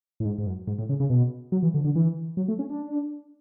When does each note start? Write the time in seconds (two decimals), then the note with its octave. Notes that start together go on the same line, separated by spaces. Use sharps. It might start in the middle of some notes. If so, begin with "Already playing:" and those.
0.20 A2
0.25 G#2
0.38 G#2
0.47 F#2
0.68 G#2
0.79 A2
0.89 C#3
1.00 C#3
1.10 B2
1.52 F#3
1.63 E3
1.74 D3
1.85 D3
1.96 E3
2.37 F#3
2.48 A3
2.59 C#4
2.70 D4